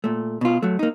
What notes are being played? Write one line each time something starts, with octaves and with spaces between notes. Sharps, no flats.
A#2 A3
B2 F4
F#3 A3
A#3 D#4